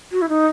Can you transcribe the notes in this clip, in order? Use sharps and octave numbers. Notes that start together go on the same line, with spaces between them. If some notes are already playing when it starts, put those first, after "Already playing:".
F#4
E4
D#4